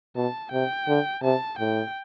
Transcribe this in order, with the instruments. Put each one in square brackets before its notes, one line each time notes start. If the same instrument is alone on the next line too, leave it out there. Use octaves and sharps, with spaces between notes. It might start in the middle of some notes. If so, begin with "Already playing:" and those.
[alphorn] B2 [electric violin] A5
[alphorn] C3 [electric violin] G5
[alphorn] D3
[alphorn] C3 [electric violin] A5
[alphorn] A2 [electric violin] G5